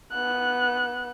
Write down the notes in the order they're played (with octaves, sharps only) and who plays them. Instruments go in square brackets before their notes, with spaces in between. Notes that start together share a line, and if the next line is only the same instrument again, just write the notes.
[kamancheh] B3 F#6